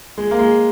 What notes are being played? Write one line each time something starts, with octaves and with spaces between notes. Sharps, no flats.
G#3
A#3
G#3